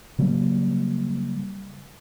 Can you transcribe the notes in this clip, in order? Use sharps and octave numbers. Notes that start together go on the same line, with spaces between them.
C#3 F#3 G3 A#3